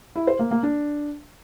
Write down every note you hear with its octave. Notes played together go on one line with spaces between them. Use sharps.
E4
C5
A#3
A#3
D4